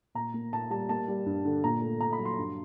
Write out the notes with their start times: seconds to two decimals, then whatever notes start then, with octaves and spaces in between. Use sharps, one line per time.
0.15 A#2 A#5
0.34 A#3
0.53 A#2 A5
0.70 G3 A5
0.89 A#3 A5
1.08 G3
1.26 G2
1.45 D3
1.64 A#2 A#5
1.82 A3
2.01 A#2 A#5
2.13 B5
2.19 F#3
2.25 C6
2.38 G2